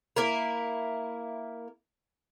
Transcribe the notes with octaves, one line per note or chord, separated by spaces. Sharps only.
A#3 E4 A#4